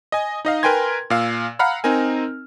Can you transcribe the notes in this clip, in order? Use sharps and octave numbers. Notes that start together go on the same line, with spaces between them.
D#5 G#5
D#4 D#5 F5
A#4 B4 G5 G#5 C6 G#6
A#2 F5 E6
F5 F#5 A#5 B5 F6
C4 D#4 A#4 G#5